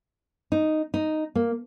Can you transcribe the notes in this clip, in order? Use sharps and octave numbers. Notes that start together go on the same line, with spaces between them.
D#4
D#4
A#3